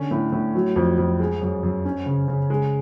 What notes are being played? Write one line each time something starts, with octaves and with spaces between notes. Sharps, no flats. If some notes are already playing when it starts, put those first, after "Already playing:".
Already playing: D3 C#4
A2
A2
F#3
F2
F2
G#3
F#2
F#2
C#4
C#3
C#3
G#3